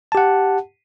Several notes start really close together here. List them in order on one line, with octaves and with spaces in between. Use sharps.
A5 G4 F#5